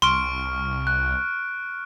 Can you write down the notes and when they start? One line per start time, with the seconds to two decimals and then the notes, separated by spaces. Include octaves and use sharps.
0.02 C2 C6 C#6 F6 D7
0.87 F#6